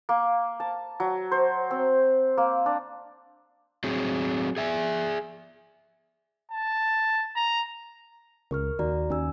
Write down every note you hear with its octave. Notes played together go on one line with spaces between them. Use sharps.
A#3
A5
F#3
C5
C4
A#3
D4
F#3 C4 G#4
G#4 E5 G5 G#5
A5
A#5
C#2 A#4 C#6 F6
D#2 F#4 D5 A#5
D#2 C#4 G#5 E6